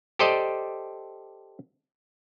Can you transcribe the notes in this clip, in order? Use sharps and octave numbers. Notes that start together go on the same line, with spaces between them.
G4 A4 C5 D5 D#5